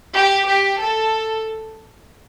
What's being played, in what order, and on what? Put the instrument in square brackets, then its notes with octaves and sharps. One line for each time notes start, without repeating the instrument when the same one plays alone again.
[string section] G4
G4
A4